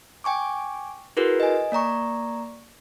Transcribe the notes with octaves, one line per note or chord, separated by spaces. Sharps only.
G5 G#5 C#6 D6
E4 F#4 G#4 A#4 B4
D#5 G#5
A#3 D5 A#5 C#6